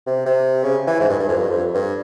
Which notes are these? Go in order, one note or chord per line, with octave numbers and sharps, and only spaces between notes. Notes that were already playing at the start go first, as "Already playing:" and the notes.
C3
C3
C#3
E3
G#2
G2
G2
F2
G2
F2
G2